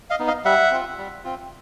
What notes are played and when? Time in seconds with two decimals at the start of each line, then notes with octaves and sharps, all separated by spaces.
0.10 D#5 F5
0.19 B3 D#4
0.27 D#5 F5
0.45 G3 E5 F#5
0.71 C4 F4
0.98 G3
1.24 C4 F4